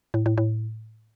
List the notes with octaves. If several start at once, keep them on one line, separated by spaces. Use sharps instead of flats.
A2
A2
A2